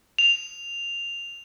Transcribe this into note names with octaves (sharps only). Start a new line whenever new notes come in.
F7